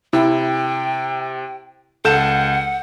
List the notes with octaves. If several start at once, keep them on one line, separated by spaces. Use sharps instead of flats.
C3 E4 G5
C#2 A4 F#5 G6 E7